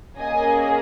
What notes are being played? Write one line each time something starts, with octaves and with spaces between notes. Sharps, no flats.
A#3 C#4 G#4 D#5 G#5